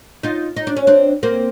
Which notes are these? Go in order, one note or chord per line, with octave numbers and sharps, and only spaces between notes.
D#4 F4
D#4
D4
C#4
C4 D4
A#3 C4